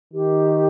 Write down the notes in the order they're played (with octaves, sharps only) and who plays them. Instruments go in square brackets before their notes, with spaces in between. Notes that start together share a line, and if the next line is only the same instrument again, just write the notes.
[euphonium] D#3 [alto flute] G4